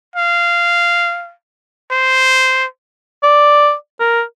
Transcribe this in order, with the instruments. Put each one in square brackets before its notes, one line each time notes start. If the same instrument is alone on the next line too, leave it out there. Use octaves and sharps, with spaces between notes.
[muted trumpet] F5
C5
[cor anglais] D5
A#4